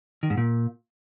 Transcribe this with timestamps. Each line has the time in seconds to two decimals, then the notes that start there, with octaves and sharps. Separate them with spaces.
0.23 D#3
0.30 G#2
0.37 A#2